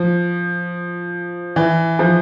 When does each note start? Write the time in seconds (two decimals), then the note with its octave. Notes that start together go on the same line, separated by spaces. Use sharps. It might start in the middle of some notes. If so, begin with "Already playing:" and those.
Already playing: F3
1.56 E3
1.99 F3